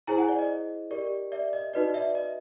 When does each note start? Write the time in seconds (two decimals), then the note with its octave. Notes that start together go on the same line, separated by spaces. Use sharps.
0.07 E4 G#4 C5 G#5 A#5
0.18 F#5 G#5
0.28 D5
0.39 D#5
0.91 G4 A#4 D5
1.32 D5 E5
1.53 D#5
1.73 D#4 F#4 B4 D5 D#5
1.94 D5 E5
2.15 D#5